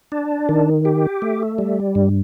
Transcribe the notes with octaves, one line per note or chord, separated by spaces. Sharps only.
D4
D#3
G4
A3
G3
G2